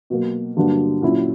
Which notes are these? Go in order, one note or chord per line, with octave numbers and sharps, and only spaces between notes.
B2 F#3 A#3
G2 D3 F#3 A#3 D4
A#2 F#3 C#4 E4